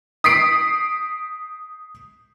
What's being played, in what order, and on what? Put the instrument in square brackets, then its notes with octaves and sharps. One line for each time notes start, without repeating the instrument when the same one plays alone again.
[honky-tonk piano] D#6 B6 C7 D7